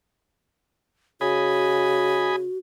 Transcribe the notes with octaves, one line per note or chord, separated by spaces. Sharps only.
C#3 F#4 D#5 G#5 B5